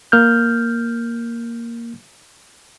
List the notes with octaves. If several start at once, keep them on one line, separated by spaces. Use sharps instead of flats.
A#3 F6 G6